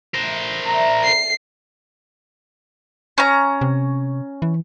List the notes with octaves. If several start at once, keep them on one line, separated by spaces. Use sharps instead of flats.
A3 A#4 C5 F#6 G6
D5 E5 A5 A#5
C7
C#4 A#5
C3
E3